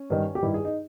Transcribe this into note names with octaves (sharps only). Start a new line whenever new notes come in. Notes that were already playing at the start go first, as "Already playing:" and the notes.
Already playing: C#4
G2 D#3
G4
G2 D#3 E4
G#4
D#4